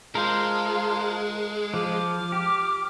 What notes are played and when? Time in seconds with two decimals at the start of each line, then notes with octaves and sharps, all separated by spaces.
0.15 G#3 F4 A#4 C5 A5
1.74 F3 D6 F6
2.32 G4